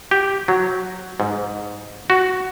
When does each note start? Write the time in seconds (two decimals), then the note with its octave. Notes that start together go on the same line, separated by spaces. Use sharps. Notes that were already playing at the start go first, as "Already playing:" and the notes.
0.11 G4
0.48 F#3
1.20 G#2
2.10 F#4